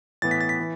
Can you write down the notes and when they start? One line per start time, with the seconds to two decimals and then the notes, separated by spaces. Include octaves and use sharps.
0.22 A2 E3 B3 A6
0.31 B6
0.41 A6
0.49 B6
0.60 E3